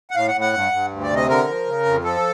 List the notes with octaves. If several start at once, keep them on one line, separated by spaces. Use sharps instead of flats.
F#5
A2 F5
F#5
A2
F#5
G2
G2
D2
D5
C3
D#5
D3 A#4
F3
C#3
F2
F3 A4